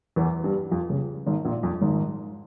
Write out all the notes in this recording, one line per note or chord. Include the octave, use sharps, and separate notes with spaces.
E2 E3
G2 G3
F2 F3
C#2 C#3
G#1 G#2
A#1 A#2
F2
G#1 G#2